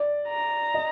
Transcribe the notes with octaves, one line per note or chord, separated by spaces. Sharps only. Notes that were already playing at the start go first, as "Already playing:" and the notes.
Already playing: D5
A#5
D#5